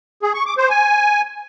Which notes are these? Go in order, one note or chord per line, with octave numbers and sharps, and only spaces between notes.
G#4
C#6
D6
C5
G#5